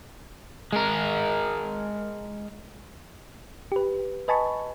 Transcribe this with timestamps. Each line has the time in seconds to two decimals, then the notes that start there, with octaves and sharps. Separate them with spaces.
0.73 G#3 A#4
3.72 G4 B4
4.28 B4 D#5 G#5 A5 B5 C#6